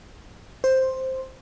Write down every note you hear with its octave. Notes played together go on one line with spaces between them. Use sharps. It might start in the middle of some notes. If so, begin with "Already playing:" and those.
C5